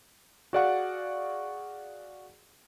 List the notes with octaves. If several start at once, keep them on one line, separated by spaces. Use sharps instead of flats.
F#4 G#4 D5 F5 F#5 C#6